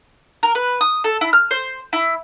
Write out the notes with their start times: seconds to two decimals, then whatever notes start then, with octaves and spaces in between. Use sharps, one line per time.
0.43 A#4
0.55 B4
0.81 D#6
1.04 A4
1.21 E4
1.33 F6
1.51 C5
1.93 E4